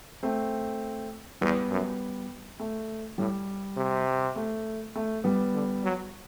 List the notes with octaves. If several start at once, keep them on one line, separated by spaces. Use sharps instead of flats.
A3 C4
E2 G3 B3
F#2
A3
A2 G3
C3
A3
A3
G3 B3
D3
F#3